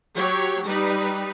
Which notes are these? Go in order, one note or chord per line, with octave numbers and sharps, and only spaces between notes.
F#3 G4 C#5
G3 D#4 B4